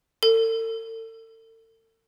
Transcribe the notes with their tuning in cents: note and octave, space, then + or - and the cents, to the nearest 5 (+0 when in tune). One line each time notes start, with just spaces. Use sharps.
A4 +40